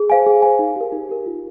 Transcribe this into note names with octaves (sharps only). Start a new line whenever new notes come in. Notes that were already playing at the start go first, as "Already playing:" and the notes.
Already playing: G#4
C5 F5 G#5
G#4
C5 F5 G#5
D#4
G4 A#4
D#4
G4 A#4
F4